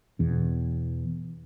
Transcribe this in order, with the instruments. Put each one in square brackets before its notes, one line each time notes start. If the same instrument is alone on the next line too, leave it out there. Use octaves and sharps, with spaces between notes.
[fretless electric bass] E2 B2